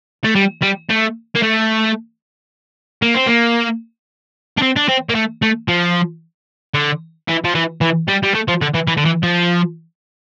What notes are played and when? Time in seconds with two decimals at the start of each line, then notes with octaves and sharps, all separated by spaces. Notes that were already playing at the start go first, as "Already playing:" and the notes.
0.24 A3
0.35 G3
0.62 G3
0.89 A3
1.35 A#3
1.42 A3
3.02 A#3
3.15 C4
3.27 A#3
4.58 D4
4.62 C4
4.76 D4
4.88 C4
5.09 A#3
5.15 A3
5.42 A3
5.68 F3
6.74 D3
7.28 E3
7.45 F3
7.55 E3
7.81 E3
8.08 G3
8.23 G3
8.34 A3
8.48 F3
8.62 D3
8.74 E3
8.87 E3
8.97 D3
9.05 E3
9.23 F3